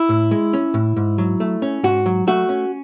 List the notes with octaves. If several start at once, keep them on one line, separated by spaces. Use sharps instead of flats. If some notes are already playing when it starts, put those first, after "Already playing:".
Already playing: E4
A2
G#3
C#4
A2
G#2
F#3
A3
C#4
G#2 F#4
F#3
A3 F#4
C#4